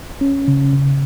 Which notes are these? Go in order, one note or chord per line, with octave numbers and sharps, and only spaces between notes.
C#4
C#3
C#3